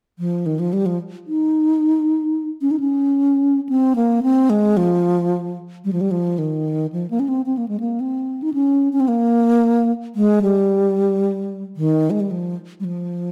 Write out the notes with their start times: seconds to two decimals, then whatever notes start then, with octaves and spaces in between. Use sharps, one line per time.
0.19 F3
0.46 D#3
0.59 F3
0.73 G3
0.86 F3
1.27 D#4
2.62 C#4
2.71 D#4
2.80 C#4
3.69 C4
3.96 A#3
4.23 C4
4.50 G#3
4.77 F3
5.85 G3
5.93 F3
6.01 G3
6.11 F3
6.38 D#3
6.92 F3
7.10 A#3
7.20 C#4
7.28 C4
7.46 C4
7.58 A#3
7.68 G#3
7.80 A#3
8.00 C4
8.42 D#4
8.54 C#4
8.93 C#4
9.00 C4
9.08 A#3
10.15 G#3
10.42 G3
11.76 D#3
12.10 G#3
12.20 G3
12.31 F3
12.80 G3
12.84 F3